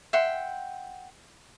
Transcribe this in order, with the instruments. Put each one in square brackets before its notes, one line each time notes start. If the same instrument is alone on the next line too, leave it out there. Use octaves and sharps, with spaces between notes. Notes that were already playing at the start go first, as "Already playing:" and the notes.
[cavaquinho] E5 F#5 G5 C6